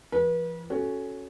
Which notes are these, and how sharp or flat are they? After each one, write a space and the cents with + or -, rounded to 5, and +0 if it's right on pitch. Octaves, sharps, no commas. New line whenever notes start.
F3 -45 B4 -35
C#4 +0 F#4 +0 A4 -10